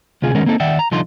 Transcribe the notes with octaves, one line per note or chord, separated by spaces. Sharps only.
D2 C3 F4 G#4 G#5
D#3 G#3 B3 C#4 A#4 C5
A#3 C4 D#4 A4
D#3 D5 E5 F#5 G5
A#5
C2 D3 F3 D#4 F4 C6